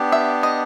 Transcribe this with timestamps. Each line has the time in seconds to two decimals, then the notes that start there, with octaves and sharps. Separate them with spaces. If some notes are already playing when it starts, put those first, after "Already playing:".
Already playing: B3 D4 G4
0.12 E5
0.43 D#5